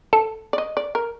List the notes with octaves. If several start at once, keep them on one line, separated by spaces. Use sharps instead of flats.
A4 A5
D5
D#5
D5
A#4